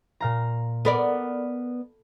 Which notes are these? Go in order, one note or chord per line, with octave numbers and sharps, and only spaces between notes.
A#2 F5 A#5
B3 A4 A#4 D5 B5